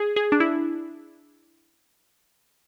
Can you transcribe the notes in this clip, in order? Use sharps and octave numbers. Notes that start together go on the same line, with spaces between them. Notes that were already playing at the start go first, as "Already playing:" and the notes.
Already playing: G#4
G#4
D4
E4